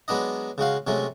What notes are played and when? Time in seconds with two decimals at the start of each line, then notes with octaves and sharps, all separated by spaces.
0.08 F#3 G#3 B3 D4 D#5
0.58 C#3 G#3 F#4 F5
0.87 C3 F#3 G#3 A3 C#4